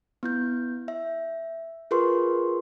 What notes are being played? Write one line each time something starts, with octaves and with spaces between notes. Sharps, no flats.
B3 E4 G6
E5
F4 G#4 A#4 B4 C6 C#6